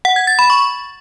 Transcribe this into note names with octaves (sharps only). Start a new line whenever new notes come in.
F#5
G#6
A6
B5
C#6